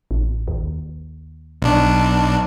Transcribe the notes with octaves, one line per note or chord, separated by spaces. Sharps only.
A1
D#2
B1 D4